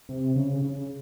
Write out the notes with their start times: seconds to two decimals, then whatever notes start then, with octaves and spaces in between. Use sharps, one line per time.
0.09 C3
0.36 C#3
0.62 C#3
0.76 C#3